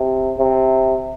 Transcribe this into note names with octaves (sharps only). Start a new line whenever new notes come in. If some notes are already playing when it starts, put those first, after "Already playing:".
Already playing: C3
C3